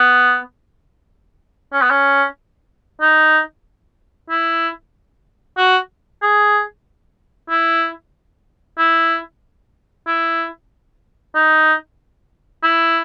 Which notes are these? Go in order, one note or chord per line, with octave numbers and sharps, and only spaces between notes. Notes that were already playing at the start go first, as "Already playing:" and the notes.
Already playing: B3
C#4
B3
C#4
D#4
E4
F#4
G#4
E4
E4
E4
D#4
E4